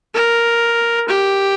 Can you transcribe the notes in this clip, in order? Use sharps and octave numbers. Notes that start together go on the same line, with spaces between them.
A#4
G4